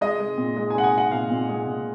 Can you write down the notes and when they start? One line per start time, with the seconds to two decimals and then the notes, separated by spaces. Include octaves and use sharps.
0.01 G#3 D#5
0.19 G#3
0.38 A#2
0.57 G#3
0.70 G#5
0.75 G#3 F#5
0.84 G#5
0.93 G#3 F#5
1.11 A#2 F5
1.30 A#2
1.49 G#3
1.67 A#2